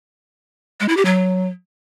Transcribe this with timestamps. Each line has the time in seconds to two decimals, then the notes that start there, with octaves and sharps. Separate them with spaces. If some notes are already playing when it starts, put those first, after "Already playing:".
0.80 G#3
0.89 E4
0.97 G4
1.05 F#3